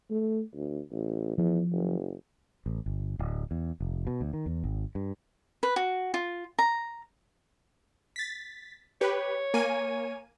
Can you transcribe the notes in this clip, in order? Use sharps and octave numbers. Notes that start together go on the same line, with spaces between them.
A3
D2
A1
E2 F3
F#1
A1
G1
D1
E2
F1
B2
D2
D#3
E2
G#1
G2
B4
F#4
F4
A#5
A6 B6
G4 B4 C#5
A#3 G#5 D#7